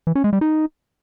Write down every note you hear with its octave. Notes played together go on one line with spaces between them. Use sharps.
E3
C#4
G#3
G3
D#4